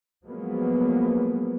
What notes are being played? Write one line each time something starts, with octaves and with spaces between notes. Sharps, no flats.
F3 F#3 G#3 A#3 B3